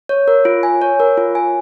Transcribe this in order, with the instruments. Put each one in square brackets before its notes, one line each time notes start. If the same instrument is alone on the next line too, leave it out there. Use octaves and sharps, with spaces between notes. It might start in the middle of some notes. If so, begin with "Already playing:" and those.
[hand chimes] C#5
A#4
F4
G#5
C#5
A#4
F4
G#5